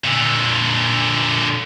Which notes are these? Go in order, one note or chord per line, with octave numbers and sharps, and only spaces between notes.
A#2 D3